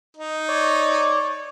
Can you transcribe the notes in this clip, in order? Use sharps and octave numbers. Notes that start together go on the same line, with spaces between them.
D#4
C#5 D5